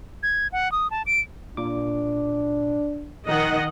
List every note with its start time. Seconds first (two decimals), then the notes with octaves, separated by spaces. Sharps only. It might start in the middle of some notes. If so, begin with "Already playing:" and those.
0.23 G#6
0.52 F#5
0.72 D#6
0.91 A5
1.06 D7
1.57 A#2 D4 D6
3.27 A#1 D#3 D#4 D#5 F#5